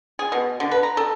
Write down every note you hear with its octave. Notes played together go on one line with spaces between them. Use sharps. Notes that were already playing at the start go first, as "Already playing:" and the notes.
G#4
B2
D3
B4
A#5
A4